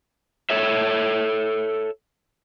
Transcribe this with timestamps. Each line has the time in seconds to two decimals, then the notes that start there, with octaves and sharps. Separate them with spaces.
0.50 A4 C#5 E5